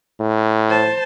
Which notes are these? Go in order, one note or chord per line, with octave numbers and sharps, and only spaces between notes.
A2
C5 A5